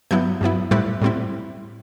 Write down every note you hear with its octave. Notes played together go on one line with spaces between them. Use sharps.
G2 F#3 B3 E4 G6
G2 F#3 B3 E4
A2 G3 C4 E4 F#6
A2 G3 C4 E4